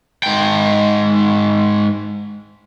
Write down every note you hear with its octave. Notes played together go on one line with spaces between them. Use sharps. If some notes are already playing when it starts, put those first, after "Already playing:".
G#2 G5